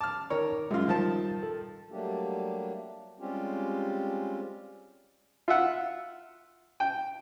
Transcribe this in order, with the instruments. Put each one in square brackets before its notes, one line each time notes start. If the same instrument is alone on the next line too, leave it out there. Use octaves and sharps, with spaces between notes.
[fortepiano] A5 F6 [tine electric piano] D6
[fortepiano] D#3 A#4 C#5
[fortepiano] F#2 F4 [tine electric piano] G#3
[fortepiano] D#3 F3 A5 [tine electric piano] G3
[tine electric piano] A4
[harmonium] F#3 G3 A3 A#3 D4 G4
G3 G#3 C4 C#4 F4 G4
[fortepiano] F4 E5 F#5
G5